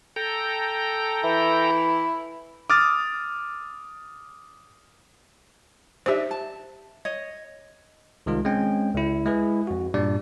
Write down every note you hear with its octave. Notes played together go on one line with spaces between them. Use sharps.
A4 G5 A#5
E3 E4
D6 D#6 F6 A6
D4 D#4 G4 C5 E5
A5
C#5 D#5
C2 D#3 G#3 F4
G#3 C4 C#4 G5
C#2 E4
G#3 E4 G#4 B4
F2 F#4
G2 A#2 G3 D4 D5